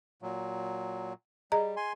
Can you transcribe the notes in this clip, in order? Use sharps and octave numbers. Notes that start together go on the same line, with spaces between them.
A#2 F#3
G3 G#4 D#5 A#5
G#5 C6